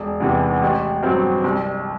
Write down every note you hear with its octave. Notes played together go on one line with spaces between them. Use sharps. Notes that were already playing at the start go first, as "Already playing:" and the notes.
Already playing: E1
E2 C3 E3
A1
G2 F#3 C4
C2